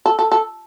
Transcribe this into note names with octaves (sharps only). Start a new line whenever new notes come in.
A4
A4
A4